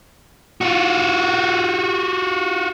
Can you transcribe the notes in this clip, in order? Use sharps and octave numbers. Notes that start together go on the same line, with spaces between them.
F4 F#4